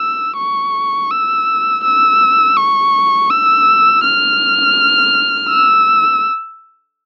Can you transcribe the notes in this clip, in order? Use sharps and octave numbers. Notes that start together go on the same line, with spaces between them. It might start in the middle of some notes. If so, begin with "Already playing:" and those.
Already playing: E6
C#6
E6
E6
C#6
E6
F6
E6